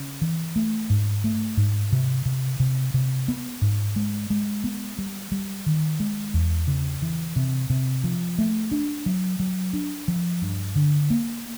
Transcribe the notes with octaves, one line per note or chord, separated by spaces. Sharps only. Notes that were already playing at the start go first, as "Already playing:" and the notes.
Already playing: C#3 C#4
E3
A3
G#2
A3
G#2
C3
C3
C3
C3
B3
G#2
G#3
G#3
B3
G3
G3
D#3
G#3
E2
C#3
E3
C3
C3
F3
A3
D4
F#3
F#3
D4
F3
G2
D3
A#3